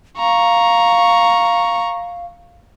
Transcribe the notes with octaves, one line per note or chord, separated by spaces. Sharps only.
F5 A#5 C#6